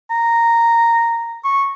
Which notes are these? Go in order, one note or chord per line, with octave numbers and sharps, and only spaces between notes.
A#5
C#6